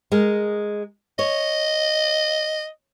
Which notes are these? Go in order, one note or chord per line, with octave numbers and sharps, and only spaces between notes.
G#3 G#4 A#4
C#5 D#5